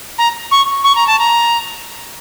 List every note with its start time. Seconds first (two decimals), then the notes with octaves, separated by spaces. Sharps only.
0.18 A#5
0.51 C#6
0.84 C#6
0.95 A#5
1.07 A5
1.19 A#5